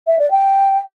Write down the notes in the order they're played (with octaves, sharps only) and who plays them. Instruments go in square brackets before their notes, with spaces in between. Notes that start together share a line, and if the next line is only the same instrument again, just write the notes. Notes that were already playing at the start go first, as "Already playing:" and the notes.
[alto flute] E5
D5
G5